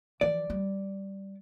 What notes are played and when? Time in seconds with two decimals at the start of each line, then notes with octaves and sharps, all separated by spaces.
0.21 E3 F3 D5
0.50 G3